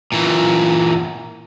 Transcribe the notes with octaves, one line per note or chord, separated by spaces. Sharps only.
A#2 E3